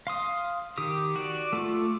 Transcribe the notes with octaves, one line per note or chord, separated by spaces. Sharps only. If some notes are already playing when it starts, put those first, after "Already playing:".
F5 C6 D#6
D#3 G4 D#6
F#4 D5
A3 F4 D6